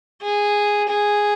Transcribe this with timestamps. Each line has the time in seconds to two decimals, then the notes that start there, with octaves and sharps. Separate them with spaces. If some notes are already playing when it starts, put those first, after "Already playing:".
0.21 G#4
0.89 G#4